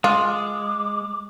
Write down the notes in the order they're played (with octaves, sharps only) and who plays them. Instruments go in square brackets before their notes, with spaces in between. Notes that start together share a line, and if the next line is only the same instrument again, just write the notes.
[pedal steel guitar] G#3 [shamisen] F4 [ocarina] D6